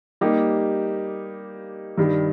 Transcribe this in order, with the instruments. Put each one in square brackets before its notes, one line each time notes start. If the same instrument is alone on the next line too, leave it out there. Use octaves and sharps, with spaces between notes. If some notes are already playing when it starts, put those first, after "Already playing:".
[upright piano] G3 A#3 D#4 G4
G2 D#3 G3